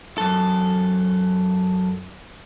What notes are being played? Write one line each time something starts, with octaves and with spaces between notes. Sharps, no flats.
F#2 A4